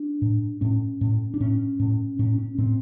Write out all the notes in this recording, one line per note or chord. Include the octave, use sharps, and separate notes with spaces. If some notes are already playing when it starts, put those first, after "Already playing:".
Already playing: D4
A2
A2 C#4
A2
D4
A2 C#4
A2
A2 C#4
C#4
A2 C4